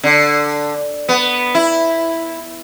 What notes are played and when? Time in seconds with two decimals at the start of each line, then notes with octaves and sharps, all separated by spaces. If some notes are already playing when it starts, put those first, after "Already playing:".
0.04 D3
1.09 B3
1.55 E4